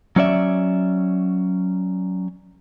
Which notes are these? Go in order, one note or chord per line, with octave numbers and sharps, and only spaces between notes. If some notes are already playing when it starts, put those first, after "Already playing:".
F#3 C#4 D5 E5